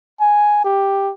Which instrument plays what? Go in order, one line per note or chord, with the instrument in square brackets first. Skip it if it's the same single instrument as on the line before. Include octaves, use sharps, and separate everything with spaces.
[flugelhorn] G#5
G4